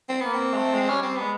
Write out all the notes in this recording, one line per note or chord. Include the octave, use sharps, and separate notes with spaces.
C4
A#3 B3
C4
G#3
A3
G#3
G3 C#4
C4
G#3 B3